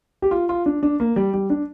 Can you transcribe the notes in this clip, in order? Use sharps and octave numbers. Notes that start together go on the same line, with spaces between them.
G4
F4
F4
D4
D4
A#3
G3
G3
D4